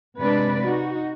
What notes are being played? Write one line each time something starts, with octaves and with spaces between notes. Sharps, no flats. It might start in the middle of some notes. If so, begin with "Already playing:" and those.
C3 G#3 D4 B4 D5
D#4 F#4